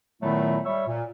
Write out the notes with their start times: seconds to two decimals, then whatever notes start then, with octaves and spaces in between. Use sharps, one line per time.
0.22 A#2 D#3 F#3 A3 B3 E4
0.65 G3 C#5 E5
0.87 A#2